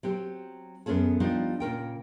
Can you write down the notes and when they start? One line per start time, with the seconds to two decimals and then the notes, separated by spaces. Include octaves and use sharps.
0.03 F#3 C4 G4
0.86 F#2 B3 C#4 G#4 A4
1.20 F3 G3 B3 D4 D#4 G4
1.60 A#2 C#3 A#4 G5